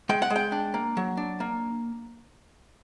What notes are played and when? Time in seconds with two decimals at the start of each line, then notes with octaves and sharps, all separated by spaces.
0.09 G#3 G5
0.22 F#5
0.30 G#3
0.36 G5
0.52 D4
0.74 A#3
0.97 F#3
1.17 D4
1.40 A#3